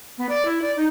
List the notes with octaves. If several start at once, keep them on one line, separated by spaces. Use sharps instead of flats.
B3
D5
E4
D5
D#4